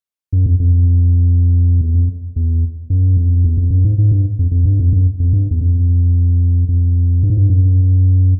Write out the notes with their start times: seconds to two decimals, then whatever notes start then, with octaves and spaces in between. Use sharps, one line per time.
0.33 F#2
0.46 F2
0.60 F2
1.81 E2
1.95 F2
2.36 E2
2.90 F#2
3.17 F2
3.44 E2
3.57 F2
3.70 F#2
3.85 G#2
3.98 G#2
4.11 G2
4.39 F2
4.51 F2
4.65 G2
4.79 F2
4.93 F#2
5.20 F2
5.33 G2
5.51 E2
5.61 F2
6.69 F2
7.23 G2
7.30 G#2
7.37 G2
7.50 F#2